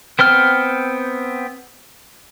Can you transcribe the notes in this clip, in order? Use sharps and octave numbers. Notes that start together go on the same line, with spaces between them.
B3 C4 G5 F6